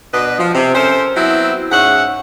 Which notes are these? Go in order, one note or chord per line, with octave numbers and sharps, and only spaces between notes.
B2 D4 B4 D#5
F3
C3
C#4 A4 A#4 C5
F#3 B3 C4 E4
G#2 C#4 E5 F#5